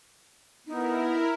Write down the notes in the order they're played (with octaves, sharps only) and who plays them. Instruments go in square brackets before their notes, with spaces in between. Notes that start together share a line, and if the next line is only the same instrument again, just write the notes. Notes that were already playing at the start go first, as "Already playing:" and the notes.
[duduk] B3 [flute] D#4 [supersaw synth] E4 A#4